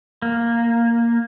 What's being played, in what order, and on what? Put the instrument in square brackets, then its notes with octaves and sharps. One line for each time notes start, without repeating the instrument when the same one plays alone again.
[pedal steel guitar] A#3